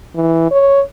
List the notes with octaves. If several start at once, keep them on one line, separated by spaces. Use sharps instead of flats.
E3
C#5